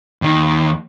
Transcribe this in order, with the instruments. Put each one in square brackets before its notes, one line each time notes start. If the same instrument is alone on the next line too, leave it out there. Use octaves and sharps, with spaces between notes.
[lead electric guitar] D#2 D#3